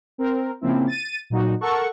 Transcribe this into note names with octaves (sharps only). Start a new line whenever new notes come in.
C4 A#4
C#3 F3 A#3 C4 E4
A6 D#7
A#2 F#3 D#4 F#4
A4 A#4 F#5 C#6